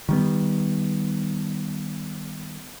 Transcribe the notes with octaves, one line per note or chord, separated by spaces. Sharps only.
D#3 G3 B3